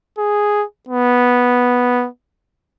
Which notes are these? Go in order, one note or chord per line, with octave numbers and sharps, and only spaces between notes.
G#4
B3